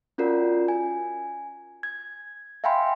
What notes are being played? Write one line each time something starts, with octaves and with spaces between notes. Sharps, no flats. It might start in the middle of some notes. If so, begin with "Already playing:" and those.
C#4 F4 F#4 A#4 D5
G#5
G#6
E5 F5 G5 G#5 B5 C6